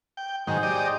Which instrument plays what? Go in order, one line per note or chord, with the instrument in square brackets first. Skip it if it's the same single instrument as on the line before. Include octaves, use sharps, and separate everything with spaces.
[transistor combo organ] G5
[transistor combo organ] G#2 D#3 F#3 [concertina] D#4 G#4 C5
[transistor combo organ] G4 D5 D#5